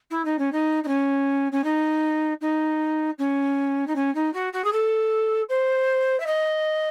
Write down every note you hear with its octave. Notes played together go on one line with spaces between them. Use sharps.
E4
D#4
C#4
D#4
D#4
C#4
C#4
D#4
D#4
C#4
D#4
C#4
D#4
F#4
F#4
G#4
A4
C5
E5
D#5